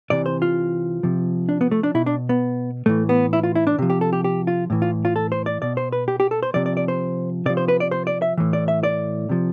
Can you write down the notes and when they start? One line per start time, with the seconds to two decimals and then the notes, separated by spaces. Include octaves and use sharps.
0.10 C3 E3 D5
0.26 C5
0.42 F4
1.03 C3 F3
1.49 D4
1.61 B3
1.71 A3
1.83 D4
1.94 B2 E4
2.06 D4
2.29 B3
2.86 A2 E3 A3
3.09 B3
3.33 E4
3.43 F4
3.55 E4
3.67 D4
3.78 C3 F3
3.90 G4
4.01 A4
4.13 G4
4.24 G4
4.47 F4
4.70 A2 E3
4.82 F4
5.05 F4
5.16 A4
5.32 C5
5.46 D5
5.62 B2 D5
5.77 C5
5.93 B4
6.08 G4
6.20 G4
6.31 A4
6.43 C5
6.54 C3 F3 D5
6.66 D5
6.77 D5
6.88 C5
7.46 C3 D5
7.49 F3
7.57 C5
7.68 B4
7.80 D5
7.91 C5
8.07 D5
8.22 E5
8.37 A2 E3
8.53 D5
8.68 E5
8.83 D5
9.29 C3 F3